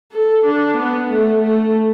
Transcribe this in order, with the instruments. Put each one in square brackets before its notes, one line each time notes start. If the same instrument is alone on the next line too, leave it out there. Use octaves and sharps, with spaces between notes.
[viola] A4
D4
B3
A3
A3